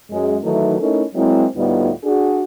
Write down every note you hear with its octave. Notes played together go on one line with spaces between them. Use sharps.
F#2 G#3
D#3 E3 F#3 A3 D#4 E4
A3 C#4 D#4 E4 A4 A#4
F#3 G#3 A#3 C4 E4
D2 A2 G3 B3 D#4 F4
D4 F#4 G#4